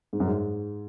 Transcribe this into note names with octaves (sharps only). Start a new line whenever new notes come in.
G#2
F#2
G#2